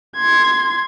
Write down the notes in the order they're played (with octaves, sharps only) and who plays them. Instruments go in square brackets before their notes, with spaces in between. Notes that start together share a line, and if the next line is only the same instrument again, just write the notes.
[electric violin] C6 G#6